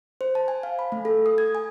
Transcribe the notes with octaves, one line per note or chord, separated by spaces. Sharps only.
C5
A5
G#5
F5
B5
A3
A4
D#6
G#6
G#5